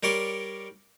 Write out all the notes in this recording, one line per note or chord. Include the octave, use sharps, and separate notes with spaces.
G3 A#4 C#5 D5 C6